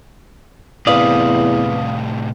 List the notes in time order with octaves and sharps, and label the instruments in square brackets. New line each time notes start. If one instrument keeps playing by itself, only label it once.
[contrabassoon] E2 [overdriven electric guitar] A2 C3 [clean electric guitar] B4 D5 [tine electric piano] F5 D#6